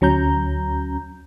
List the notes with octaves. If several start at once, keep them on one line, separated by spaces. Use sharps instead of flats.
D2 F#3 C#4 A#5 G6